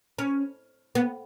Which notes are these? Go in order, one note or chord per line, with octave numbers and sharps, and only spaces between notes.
C#4
B3